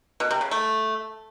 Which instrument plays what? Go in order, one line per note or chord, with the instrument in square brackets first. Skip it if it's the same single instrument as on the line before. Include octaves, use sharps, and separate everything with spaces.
[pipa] B2
C3
C#3
A3